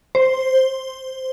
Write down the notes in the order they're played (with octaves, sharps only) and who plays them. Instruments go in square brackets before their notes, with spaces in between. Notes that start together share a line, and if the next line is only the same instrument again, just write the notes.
[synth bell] C5